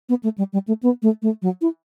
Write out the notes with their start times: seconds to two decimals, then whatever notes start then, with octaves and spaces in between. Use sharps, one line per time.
0.09 B3
0.23 A3
0.38 G3
0.53 G3
0.68 A3
0.83 B3
1.02 A3
1.22 A3
1.42 F#3
1.61 E4